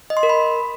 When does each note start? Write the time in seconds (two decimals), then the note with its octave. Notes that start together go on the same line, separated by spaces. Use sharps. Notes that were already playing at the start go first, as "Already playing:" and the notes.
0.10 D#5
0.17 C6
0.23 A#4
0.29 B5